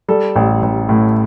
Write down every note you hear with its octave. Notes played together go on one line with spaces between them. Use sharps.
G3 A4
A1
A1
A2